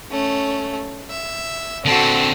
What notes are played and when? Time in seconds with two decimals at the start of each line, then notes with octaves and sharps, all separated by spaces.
0.10 A3 C#4
1.10 E5
1.86 D3 C4 F#4 A4